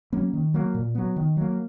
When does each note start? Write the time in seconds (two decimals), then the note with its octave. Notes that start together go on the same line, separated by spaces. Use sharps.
0.13 F#3 A#3 C#4
0.33 D#3
0.54 F#3 A#3
0.74 A#2
0.95 F#3 B3
1.16 D#3
1.37 F#3 A#3